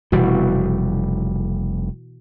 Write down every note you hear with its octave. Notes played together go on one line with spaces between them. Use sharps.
F1 B2 E3 G3 F#4